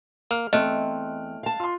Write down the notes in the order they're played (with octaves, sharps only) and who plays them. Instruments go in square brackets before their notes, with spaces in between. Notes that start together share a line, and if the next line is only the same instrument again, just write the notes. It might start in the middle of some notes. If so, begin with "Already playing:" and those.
[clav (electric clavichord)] A#3 [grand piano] F6
[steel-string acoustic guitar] E2 C4 [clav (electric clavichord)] A3 [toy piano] D#5 [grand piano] F6 F#6 D7
[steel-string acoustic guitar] F5 A5
[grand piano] F4 C6